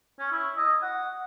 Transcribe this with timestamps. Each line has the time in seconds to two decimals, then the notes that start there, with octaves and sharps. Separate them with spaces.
0.19 C#4
0.32 E4
0.57 D#5
0.82 F#5